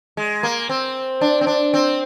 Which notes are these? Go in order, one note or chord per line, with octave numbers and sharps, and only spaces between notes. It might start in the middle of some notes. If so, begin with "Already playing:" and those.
G#3
A#3
C4
D4
C4
D4
C4